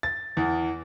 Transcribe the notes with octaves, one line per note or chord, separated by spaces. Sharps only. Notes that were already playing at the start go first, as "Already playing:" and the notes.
A6
E2 E3